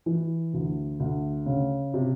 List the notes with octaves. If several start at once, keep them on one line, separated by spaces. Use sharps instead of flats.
E3
D2
D2
C#3
C3